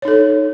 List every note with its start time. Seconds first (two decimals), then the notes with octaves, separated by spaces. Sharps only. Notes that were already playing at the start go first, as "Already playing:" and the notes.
0.02 C#5
0.05 D#4
0.08 A4